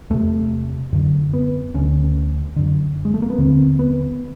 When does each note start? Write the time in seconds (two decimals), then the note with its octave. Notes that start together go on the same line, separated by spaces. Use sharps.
0.10 E2 C3 A3
0.93 F#2 D3
1.33 B3
1.74 D2 D3 C#4
2.56 F#2 D3
3.05 G#3
3.14 A3
3.22 A#3
3.30 B3
3.38 D#2 D3 C4
3.79 B3